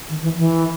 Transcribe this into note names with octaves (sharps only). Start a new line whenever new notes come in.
D#3
E3
E3